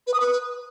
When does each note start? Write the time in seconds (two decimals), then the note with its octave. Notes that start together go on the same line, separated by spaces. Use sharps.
0.07 B4
0.13 D#6
0.20 B4